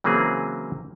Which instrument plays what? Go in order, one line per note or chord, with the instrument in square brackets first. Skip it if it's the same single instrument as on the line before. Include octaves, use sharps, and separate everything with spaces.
[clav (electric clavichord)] C#3 E3 F#3 A#3 C4 G#4